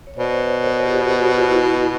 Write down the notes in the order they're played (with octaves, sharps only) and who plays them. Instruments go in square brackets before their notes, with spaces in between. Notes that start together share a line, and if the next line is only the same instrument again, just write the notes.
[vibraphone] C#5
[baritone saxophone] B2 [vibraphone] C5 D5
[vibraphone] B4 C#5
A#4 C5
F4 G4
F#4
F4
E4 F#4